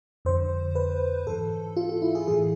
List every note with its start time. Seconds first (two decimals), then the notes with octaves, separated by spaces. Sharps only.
0.25 F2 D3 C5
0.75 B4
1.27 G#2 E3 A4
1.77 F4
1.89 F4
2.02 E4
2.15 G#4
2.28 A2 E3 G#4